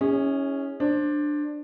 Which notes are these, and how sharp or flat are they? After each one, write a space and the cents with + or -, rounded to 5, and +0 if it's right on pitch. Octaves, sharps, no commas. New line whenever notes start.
C#4 +0 E4 -45 G#4 -30
D4 +10 C5 +20